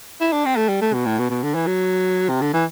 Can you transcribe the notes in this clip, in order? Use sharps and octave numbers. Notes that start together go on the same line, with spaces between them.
E4
D4
C4
A3
G3
A3
B2
A2
B2
B2
D3
E3
F#3
C3
D3
E3